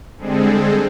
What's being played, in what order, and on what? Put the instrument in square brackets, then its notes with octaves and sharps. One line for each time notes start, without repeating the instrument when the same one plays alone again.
[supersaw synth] D3 G3 G#3 C4 G#4 A4